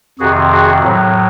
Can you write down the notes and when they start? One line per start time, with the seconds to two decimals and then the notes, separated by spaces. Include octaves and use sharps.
0.19 F2 C3 D#3 F#4 G#4
0.51 F#4 G#4
0.83 A2 F#3